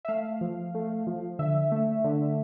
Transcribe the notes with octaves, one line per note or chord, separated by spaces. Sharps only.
E5
A3 F5
F3
A3
F3
D3 E5
A3
D3